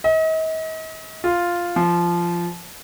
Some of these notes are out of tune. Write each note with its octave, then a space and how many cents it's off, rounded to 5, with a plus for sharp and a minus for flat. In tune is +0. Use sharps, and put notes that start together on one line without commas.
D#5 +40
F4 +0
F3 -15